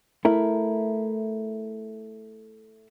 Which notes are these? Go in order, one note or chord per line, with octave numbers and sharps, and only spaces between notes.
A3 E4 A#4